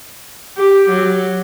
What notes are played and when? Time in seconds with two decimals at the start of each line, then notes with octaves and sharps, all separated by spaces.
0.57 G4
0.90 F#3